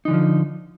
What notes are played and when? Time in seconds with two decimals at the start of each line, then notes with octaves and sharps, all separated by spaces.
0.05 D#4
0.08 E3
0.11 D3
0.13 F3